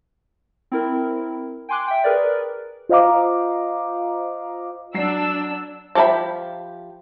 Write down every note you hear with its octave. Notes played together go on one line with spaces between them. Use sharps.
C4 E4 A#4
G5 G#5 C6 D6 F#6
E5 G5
G#4 A#4 B4 D5
F4 C5 D#5 F5 A#5 D6
F#3 D4 E6 C7
F3 G4 A4 E5 B5